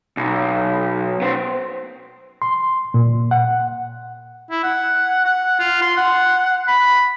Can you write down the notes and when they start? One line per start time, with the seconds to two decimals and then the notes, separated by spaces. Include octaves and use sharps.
0.17 B1
1.22 B3 C5
2.42 C6
2.94 A#2
3.31 F#5
4.51 E4
4.63 F#5
5.25 F#5
5.59 F4
5.82 C6
5.97 F#5
6.68 B5